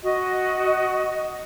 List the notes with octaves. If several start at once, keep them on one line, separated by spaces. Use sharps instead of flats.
F#4 D#5